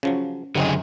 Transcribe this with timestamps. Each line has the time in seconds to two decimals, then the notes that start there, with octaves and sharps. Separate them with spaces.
0.03 C#3 F3 F#3 C#4
0.55 C#2 F#2 D3 G3 C4 D#4 G#4